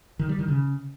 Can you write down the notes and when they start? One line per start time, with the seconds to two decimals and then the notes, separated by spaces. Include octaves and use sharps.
0.19 D#3
0.29 G3
0.39 D#3
0.48 C#3